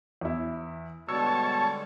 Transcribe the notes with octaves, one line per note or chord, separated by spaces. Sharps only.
E2 E4
B2 D3 G3 G#3 C#5 A5 E6